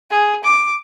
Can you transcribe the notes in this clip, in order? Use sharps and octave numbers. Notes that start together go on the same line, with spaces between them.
G#4
D6